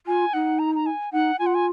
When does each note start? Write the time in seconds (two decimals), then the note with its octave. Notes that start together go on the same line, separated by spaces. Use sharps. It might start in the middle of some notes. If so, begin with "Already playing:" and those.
0.07 F4 G#5
0.33 D#4 F#5
0.59 A#5
0.75 A#5
0.86 G#5
1.12 D#4 F#5
1.39 F4 G#5
1.46 F#5
1.54 G#5